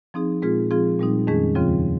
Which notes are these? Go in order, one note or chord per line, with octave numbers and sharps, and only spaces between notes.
F3 C4 D#4 G#4
A#2 G#3 C4 F4 G#4
F3 C4 F4 G#4
A#2 G3 C4 D#4
F2 D#3 G#3 C#4 G#4
D#2 C#3 F3 C4 F4